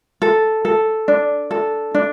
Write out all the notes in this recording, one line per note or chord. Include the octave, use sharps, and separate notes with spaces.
A4
A4
D4
A4
D4